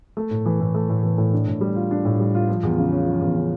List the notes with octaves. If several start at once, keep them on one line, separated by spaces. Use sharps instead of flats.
A3
A2
E3
A2
A3
A2
E3
A2
D4
A2
G3
F4
D4
A2
G3
F4
F3
E2
C#3
C#4
F3
E2
C#3